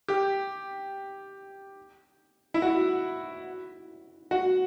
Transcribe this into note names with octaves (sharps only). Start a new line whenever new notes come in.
G4
E4
F#4
F#4